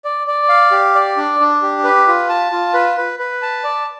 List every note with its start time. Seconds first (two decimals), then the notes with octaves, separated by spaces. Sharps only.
0.05 D5
0.27 D5
0.49 F5
0.71 G4
0.95 D5
1.17 D4
1.40 D4
1.62 G4
1.84 B4
2.07 F4
2.29 A5
2.52 F4
2.74 B4
2.98 B4
3.19 B4
3.42 A5
3.64 D5